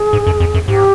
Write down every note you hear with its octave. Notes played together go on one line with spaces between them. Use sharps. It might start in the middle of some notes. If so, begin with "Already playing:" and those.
Already playing: G#4
G#2
F#2
F2
F#2
G#2 G4